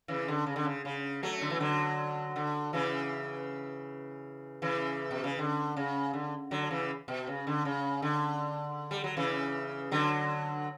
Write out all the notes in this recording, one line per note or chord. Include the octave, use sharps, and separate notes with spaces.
C#3 E3
D3
C#3
D3
C#3
C#3
F#3 A3
D3
E3
D3 F#3
D3
C#3 E3
C#3 E3
B2
C#3
D3
C#3
D3
D3 F#3
C#3 E3
B2
C#3
D3
C#3
D3
G3
F#3
C#3 E3
D3 F#3